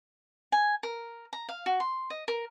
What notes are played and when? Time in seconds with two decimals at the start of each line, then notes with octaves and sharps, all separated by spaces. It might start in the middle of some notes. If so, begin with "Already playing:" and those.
0.52 G#5
0.83 A#4
1.33 A#5
1.49 F5
1.66 F#4
1.80 C6
2.10 D#5
2.28 A#4